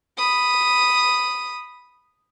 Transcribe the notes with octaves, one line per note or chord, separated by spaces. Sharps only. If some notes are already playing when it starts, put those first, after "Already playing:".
B5 D#6